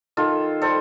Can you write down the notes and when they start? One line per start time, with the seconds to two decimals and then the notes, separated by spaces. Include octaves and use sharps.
0.17 D#3 F4 A4
0.62 G3 A4 C5